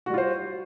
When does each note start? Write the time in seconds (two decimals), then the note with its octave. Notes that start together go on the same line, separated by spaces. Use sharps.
0.06 F#4
0.10 G3
0.14 F4
0.18 C5